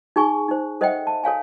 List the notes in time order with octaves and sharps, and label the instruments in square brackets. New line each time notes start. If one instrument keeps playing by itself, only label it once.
[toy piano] D#4 G#4 G#5 C#6
D#4 C5
A4 C5 D#5 E5 F#5 G5
A5
A4 C#5 F5 G#5